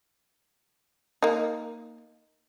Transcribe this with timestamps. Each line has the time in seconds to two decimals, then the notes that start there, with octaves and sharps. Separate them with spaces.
1.22 A#3 D#4